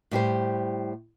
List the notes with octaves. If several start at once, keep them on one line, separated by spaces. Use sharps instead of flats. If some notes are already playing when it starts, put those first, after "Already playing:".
A2 G3 G4 C5